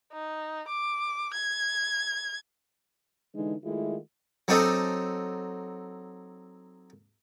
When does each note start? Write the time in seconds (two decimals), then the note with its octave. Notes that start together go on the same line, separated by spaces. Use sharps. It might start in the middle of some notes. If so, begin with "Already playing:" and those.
0.13 D#4
0.68 D6
1.34 G#6
3.35 D3 E3 G#3 D#4
3.64 D#3 G#3 A3 E4 F4
4.48 F#3 C4 D4 D#4 A4